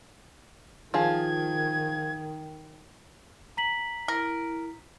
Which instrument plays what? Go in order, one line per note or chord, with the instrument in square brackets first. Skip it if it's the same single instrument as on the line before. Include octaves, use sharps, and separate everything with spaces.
[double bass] D#3 [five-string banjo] F3 F4 G#4 [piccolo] G#6
[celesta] A#5 B6 F#7
[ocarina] E4 [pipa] A#4